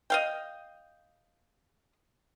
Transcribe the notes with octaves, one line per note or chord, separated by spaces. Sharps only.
D#5 F5 G5